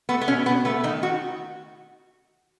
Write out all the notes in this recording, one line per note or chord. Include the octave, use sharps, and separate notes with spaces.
A3 B3
B3
B2 C#4
B2 B3
A3 B3
D#3 D#4
D#3 F#4